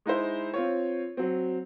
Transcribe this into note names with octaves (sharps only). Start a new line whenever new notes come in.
G#3 D#4 E4 C5
C4 F4 C#5
F#3 C4